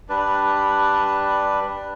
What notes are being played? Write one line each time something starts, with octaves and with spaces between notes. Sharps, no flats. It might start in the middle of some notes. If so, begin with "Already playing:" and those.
G3 D4 B4